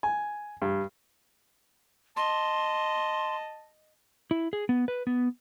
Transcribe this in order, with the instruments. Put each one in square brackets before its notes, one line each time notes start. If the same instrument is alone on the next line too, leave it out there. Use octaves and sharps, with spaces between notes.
[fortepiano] G#5
G2
[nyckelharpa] D#5 [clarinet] A5 [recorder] C6
[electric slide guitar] E4
G#4
B3
B4
B3